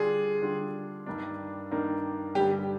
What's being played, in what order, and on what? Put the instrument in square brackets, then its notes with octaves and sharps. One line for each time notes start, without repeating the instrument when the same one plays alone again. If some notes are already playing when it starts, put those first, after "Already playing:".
Already playing: [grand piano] D3 G3 D4 F4 [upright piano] G#4
[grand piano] D3 G3 D4 F4
G2 D#3 A#3 D4
G2 D#3 A#3 D4
[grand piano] G2 D3 G3 [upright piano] G4